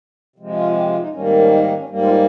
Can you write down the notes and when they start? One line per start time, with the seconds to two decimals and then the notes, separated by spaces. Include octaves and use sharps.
0.36 C3 F3 G#3
0.55 F4
0.74 G4
0.87 F4
0.99 D#4
1.12 G#2 D#3 G3 A#3 C#4
1.25 C4
1.38 C#4
1.51 D#4
1.63 D#4
1.76 C#4
1.89 G#2 G3 A#3
2.01 F4